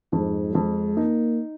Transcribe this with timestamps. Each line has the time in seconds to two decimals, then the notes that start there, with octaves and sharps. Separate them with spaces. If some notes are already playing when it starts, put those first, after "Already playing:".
0.13 F2 G#2
0.54 F2 G#3
0.97 A#3 D#4